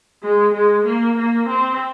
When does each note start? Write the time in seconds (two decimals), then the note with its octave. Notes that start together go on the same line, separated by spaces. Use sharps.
0.23 G#3
0.54 G#3
0.86 A#3
1.18 A#3
1.49 C4